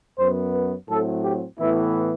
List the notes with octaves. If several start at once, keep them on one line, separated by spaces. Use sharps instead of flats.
F#2 F#3 B3 C5
B4
A2 F#3 C4 A4
G4
A2 E3 B3 E4